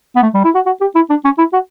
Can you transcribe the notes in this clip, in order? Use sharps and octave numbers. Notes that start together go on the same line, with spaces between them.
B3
A3
G3
E4
F#4
F#4
G4
E4
D4
C#4
E4
F#4